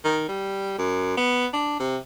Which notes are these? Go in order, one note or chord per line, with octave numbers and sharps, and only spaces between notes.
D#3
G3
F#2
B3
D4
C3